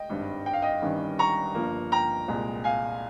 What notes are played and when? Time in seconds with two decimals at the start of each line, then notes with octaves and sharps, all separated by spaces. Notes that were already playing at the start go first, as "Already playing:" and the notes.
Already playing: D#5 G5
0.09 G#1 G2 G3
0.46 G5
0.53 F5
0.62 D#5 G5
0.82 G1 G2 D#3 G3 C#4
1.19 A#5 C#6
1.55 G1 G2 F3 A#3
1.92 G5 A#5
2.28 C2 A#2 G#3
2.64 F5 G#5